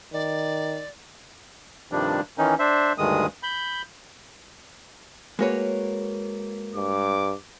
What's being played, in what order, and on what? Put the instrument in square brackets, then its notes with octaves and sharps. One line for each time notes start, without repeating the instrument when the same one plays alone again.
[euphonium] D#3 [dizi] D5
[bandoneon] G2 C3 D#3 F3 G3 D4
D#3 E3 C#4 D#4
D4 C5 E5
D2 G2 D#3 G#3 D#6
B5 G6
[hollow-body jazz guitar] G#3 A#4 B4 [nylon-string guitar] A#3 F#4 C#5
[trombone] G2 [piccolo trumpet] D6